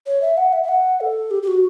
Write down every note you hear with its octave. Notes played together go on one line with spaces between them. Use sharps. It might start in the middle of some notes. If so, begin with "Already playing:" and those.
C#5
E5
F#5
E5
E5
F#5
A4
G4
G4
F#4